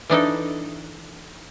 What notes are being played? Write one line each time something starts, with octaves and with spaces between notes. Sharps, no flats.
E3 D4 D#4 A4